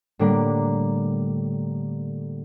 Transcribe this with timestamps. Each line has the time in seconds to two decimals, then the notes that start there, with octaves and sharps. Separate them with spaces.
0.19 A2 D3 G3 A#3 D4